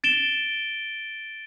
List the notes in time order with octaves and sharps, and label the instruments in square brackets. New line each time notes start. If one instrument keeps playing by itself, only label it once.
[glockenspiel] A6 D7 E7 G7